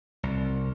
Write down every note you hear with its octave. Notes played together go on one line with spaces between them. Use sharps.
C2